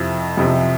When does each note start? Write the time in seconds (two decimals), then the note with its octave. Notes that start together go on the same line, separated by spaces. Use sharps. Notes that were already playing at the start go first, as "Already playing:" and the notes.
Already playing: F2 C3 F3 E4
0.37 F2 C3 F3